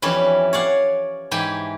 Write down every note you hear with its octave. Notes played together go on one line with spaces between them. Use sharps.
F2 E3 G3 C#4 E4
C#5 D5 F5 F#5
G#2 E3 G4 G5 G#5